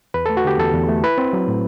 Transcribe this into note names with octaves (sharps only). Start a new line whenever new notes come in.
E2 B4
A3 A4
F#4
D3 G4
E2 A4
E2
A3
E4 B4
C4
F#3
A2